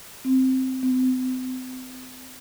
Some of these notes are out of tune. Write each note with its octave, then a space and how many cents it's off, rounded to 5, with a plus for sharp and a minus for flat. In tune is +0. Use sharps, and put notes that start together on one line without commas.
C4 -5
C4 -35